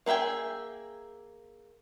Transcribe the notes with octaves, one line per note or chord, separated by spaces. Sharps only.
A#3 G#4 E5 G5 G#5